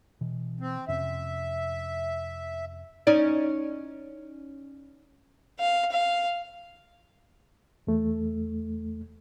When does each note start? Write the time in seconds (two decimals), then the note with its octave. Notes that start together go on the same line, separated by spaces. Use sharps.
0.21 B2 E3
0.60 C4
0.88 F2 C3 C#4 E5
3.07 C#4 D#4 D5
5.59 F5
5.92 F5
7.87 E2 A3